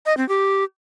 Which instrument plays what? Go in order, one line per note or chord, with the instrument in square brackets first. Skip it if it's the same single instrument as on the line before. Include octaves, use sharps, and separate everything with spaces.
[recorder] D#5
C4
G4